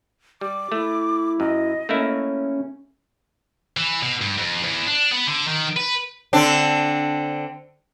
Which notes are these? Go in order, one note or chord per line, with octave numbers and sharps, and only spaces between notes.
G3 D6
A3 E4
F#2 D#5
A3 A#3 C#4 E4
E3
B2
G2
F2
E2
D4
B3
D3
D#3
B4
D3 C4 D4